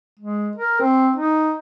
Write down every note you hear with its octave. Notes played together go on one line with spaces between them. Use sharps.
G#3
A#4
C4
D#4